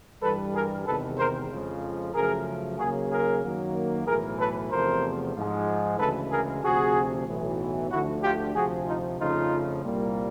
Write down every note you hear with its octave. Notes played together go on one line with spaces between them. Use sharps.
G2 E3 G3 A4 B4
G#4 A#4
E2 C3 D#3 G#3 A4 B4
A#4 C5
F2 C#3 F3 G#3
F#2 C#3 F3 A3 G#4 A#4
D#2 C#3 F#3 A#3 F#4 G#4
G#4 A#4
F#2 D#3 F#3 A#3
B1 A2 E3 G#4 A#4
A4 B4
E2 C3 F3 A3 A#4 C5
G#2 F3 G#3
D2 C#3 E3 G#3 A4 B4
G#4 A#4
D2 C3 F3 F#4 G#4
B1 A2 E3
D2 D3 F3 A3 E4 F#4
F4 G4
D2 C3 F3 F#4 G#4
D#4 F4
F2 C#3 F3 A3 D#4 F4
C2 A#2 G3 A#3